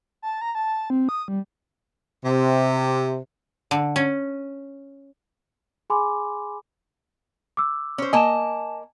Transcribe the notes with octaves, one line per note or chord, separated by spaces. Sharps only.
A5
A#5
A5
C4
D#6
G3
C3
D3
C#4
G#4 G#5 B5 C6 D6
D6 E6
C#4 C5
A#3 D#5 G#5 A5 E7